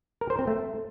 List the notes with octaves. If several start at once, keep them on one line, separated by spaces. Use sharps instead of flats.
A#4
C5
C4
A3